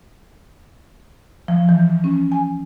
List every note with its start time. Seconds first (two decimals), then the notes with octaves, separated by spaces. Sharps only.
1.48 F3
1.69 E3
2.04 C#4
2.32 G#5